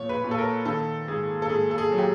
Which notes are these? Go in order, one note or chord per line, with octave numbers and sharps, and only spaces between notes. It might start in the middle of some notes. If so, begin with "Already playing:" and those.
Already playing: A#2 F3 C#5
B4
A#2
A4
A#4
D#3 A4
G#2 G#4
A4
G#2 G#4
A4
G#4
F#3
G4